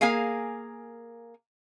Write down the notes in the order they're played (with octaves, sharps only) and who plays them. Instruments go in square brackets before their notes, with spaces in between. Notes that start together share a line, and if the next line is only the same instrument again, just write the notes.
[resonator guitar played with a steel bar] A#3 G#4 A#4 F5 G#5